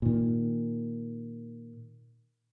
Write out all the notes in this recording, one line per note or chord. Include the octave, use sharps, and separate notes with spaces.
A#2 D#3